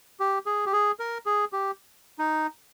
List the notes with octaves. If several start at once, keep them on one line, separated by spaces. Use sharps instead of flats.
G4
G#4
G4
G#4
A#4
G#4
G4
D#4